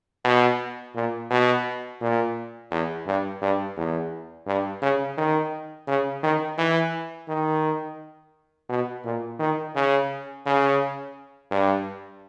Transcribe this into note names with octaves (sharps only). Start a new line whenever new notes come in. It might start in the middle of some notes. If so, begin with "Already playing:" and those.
B2
A#2
B2
A#2
E2
G2
G2
E2
G2
C#3
D#3
C#3
D#3
E3
D#3
B2
A#2
D#3
C#3
C#3
G2